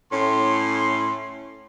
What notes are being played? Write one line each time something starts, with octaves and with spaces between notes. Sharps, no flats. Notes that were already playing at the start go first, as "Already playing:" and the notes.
A2 C#4 C6